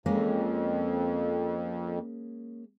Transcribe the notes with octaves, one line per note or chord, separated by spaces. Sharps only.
F2 G#3 A#3 C#4